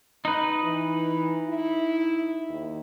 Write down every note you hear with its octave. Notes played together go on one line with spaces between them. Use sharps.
D#4 B4
E3
E4
D#2